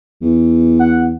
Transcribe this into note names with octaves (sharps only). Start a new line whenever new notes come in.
E2
F#5